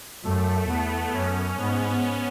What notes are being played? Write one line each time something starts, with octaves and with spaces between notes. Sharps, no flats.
F#2 A3
E2 B3
F#2 C#4
G#2 B3